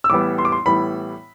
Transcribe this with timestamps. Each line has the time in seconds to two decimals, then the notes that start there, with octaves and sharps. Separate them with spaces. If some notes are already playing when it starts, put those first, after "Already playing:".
0.04 E6
0.10 A2 E3 G3 B3 D6
0.38 C6
0.45 D6
0.52 C6
0.66 A2 E3 G3 B3 B5